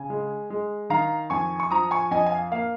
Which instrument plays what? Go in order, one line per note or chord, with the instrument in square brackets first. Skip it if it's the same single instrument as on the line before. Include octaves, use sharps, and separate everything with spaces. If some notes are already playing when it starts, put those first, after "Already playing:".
Already playing: [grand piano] C#3 G#5
G#3
G#3
D#3 F5 A#5
F2 G#5 C#6
C#6
F3 A#5 D#6
G#5 C#6
F2 D#5 G#5
G#5
F5
A#3 F5